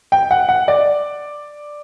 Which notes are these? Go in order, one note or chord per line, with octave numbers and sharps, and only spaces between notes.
G5
F#5
F#5
D5